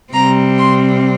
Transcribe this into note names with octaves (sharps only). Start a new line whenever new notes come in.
C3 G3 C4 A#5
C6